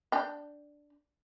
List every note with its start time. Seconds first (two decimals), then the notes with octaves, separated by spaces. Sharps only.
0.12 D4 G5